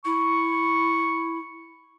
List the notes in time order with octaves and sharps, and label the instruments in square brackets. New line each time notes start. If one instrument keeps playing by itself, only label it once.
[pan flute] E4 [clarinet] C#6